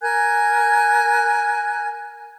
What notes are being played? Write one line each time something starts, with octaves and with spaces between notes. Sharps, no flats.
A#4 G#5 F#6 G#6